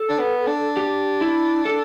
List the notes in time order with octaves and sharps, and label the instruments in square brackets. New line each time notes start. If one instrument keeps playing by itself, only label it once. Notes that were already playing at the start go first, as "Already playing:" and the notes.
Already playing: [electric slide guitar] A4
[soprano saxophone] D4
B3
D4
[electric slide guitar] G4
E4
A4